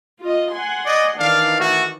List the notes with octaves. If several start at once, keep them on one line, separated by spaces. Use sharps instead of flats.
F4 D#5
F#5 G#5 C6
D5 D#5
D#3 E3 D4 D5 F5
A3 F#4